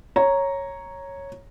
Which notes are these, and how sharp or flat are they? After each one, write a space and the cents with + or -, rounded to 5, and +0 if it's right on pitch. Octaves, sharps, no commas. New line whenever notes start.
C#5 -5 A#5 +0